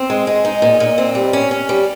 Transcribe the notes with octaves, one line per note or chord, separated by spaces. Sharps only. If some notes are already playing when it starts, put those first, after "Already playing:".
Already playing: C4
G#3
G#3
D#4
A#2
A#2
C4
G3
C#4
C#4
G3